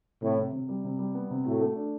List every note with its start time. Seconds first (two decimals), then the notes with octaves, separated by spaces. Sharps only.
0.22 A2 C3
0.37 C3
0.53 C3
0.69 G3
0.84 C3
0.99 G3
1.15 B3
1.31 C3
1.46 A2 F#4
1.61 A3
1.76 D4